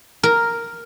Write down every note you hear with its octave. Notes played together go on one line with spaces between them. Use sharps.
A#4